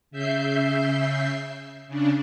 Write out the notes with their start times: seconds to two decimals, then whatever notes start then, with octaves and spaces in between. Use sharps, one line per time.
0.11 C#3 E5 G6 C7
1.87 C#3 D4